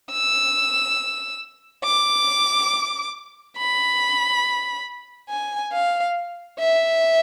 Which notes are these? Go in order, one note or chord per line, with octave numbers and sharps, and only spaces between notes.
E6
D6
B5
G#5
F5
E5